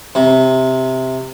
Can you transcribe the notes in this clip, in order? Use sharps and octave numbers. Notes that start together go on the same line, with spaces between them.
C3